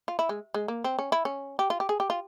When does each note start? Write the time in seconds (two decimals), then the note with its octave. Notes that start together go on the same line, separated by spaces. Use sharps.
0.08 F4
0.19 E4
0.29 G#3
0.54 G#3
0.68 A#3
0.84 C4
0.99 C#4
1.12 E4
1.25 C#4
1.59 G4
1.70 F4
1.80 G4
1.89 G#4
2.00 G4
2.10 F4